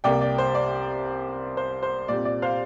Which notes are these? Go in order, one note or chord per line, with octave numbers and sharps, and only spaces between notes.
C2 C3 A#3 D5 G5
D5
C5
D5
C5
C5
A#2 G3 C4 D5
D5
C5 F5